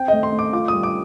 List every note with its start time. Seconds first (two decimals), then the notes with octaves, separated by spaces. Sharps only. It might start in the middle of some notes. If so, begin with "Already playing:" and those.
Already playing: C4 G5
0.08 A3 D#5
0.23 C6
0.32 A3
0.39 D6
0.53 F4 D6
0.68 G3 D#6
0.83 D6